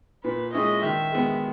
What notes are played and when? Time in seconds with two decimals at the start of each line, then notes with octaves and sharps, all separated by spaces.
0.24 A#2 B4
0.53 G#3 C#4 E4 D#5
0.82 D#3 E5
1.12 G#3 B3